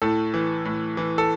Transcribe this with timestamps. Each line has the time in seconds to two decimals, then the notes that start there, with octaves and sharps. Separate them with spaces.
0.02 A2 A4
0.34 E3
0.65 A2
0.97 E3
1.18 A4